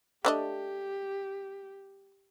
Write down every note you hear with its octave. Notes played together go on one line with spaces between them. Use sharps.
A3 D4 G4 D#5